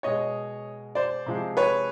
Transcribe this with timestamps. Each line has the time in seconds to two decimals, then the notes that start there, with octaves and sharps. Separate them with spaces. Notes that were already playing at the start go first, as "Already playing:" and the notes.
0.03 B2 G#3 C#5 D#5
0.95 C5 D5
1.26 C3 F3 G#3
1.57 B4 C#5